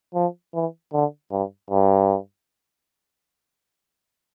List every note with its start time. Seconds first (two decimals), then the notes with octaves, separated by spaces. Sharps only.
0.15 F3
0.54 E3
0.93 D3
1.32 G2
1.71 G2